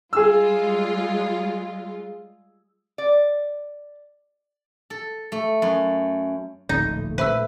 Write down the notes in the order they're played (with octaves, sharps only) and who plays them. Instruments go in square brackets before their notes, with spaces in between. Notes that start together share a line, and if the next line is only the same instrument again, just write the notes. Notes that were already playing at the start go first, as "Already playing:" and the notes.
[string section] G3 G#3 F4 [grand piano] G#4 E6
[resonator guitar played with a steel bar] D5
[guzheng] A4
A3
F#2
[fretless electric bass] D1 A#1 [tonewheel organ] A#2 A3 [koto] D#4
[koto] B4 [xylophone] C5 E5 E6